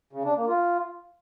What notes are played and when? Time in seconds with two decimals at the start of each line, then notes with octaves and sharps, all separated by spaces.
0.13 C#3
0.25 D4
0.36 A#3
0.48 F4